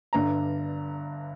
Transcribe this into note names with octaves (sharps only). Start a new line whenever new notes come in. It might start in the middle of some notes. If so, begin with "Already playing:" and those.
G1 G2 D3 A#5